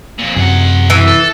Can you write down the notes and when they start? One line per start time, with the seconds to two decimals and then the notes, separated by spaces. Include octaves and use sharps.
0.19 F2 A#2
0.36 F#2 C3 F#3 G#4 F#5
0.90 E3
1.07 A4